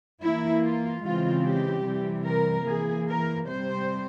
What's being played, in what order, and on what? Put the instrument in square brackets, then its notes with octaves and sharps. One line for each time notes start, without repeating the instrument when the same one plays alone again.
[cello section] E3 A#3 E4
F4
C#3 E3 G#3 C4 F4
G4
C3 E3 G3
A#4
E3 A#3 G#4
A#4
C3 G3 C4 C5